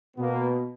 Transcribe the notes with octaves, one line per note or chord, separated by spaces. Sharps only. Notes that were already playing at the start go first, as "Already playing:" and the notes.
B2 A#3 B3